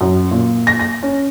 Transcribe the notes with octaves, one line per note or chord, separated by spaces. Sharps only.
F#2
A#2
A#6
A#6
C#4